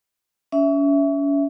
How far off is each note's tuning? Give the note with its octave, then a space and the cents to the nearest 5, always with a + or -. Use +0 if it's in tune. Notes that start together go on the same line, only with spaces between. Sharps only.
C#4 +35 E5 +0